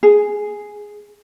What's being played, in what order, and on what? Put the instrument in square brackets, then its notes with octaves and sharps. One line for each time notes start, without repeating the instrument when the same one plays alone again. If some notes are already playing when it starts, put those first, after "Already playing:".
[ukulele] G#4